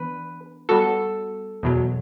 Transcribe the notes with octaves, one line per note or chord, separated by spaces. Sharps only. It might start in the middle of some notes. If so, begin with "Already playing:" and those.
Already playing: E3 B3 D4 B4
G3 B3 F#4 A4
E2 B2 F#3